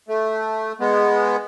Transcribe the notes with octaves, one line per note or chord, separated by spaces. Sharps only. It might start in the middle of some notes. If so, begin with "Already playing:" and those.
A3
G#3 B3